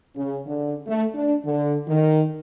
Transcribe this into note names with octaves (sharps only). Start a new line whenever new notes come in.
C#3
D3
A3
D4
D3
D#3